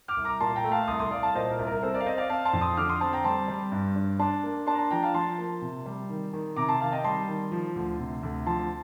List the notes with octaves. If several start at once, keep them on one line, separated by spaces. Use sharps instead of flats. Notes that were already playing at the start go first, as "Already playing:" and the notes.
D6 F6
C2
A#5 D6
A#2 A5 C6
G5 A#5
A3
F5 A5
C2 C6 D#6
C6 D#6
C2 D5 F5
F5 A5
A#2 C5 D#5
A#4
C2
A#4
C4 A4 C5
A#4 D5
F5
C4 C5 D#5
D5 F5
C4 F5 A5
A5 C6
F2
C6 D#6
D3 D6 F6
C6 D#6
C4 A5 C6
G5 A#5
G3 A5 C6
G3
G2
D4
D4 A5 C6
A#3
D4 A5 C6
A#5
A5 C6
F3 G5 A#5
F5 A5
F3 A5 C6
A#3
C3
G3
D#3
D#3
C3 A#5 D6
A5 C6
D#3 F5 A5
D#5 G5
G3 A5 C6
D#3
F3
D2
C3
D2
F3 A5 C6